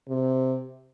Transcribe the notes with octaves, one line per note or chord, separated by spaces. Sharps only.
C3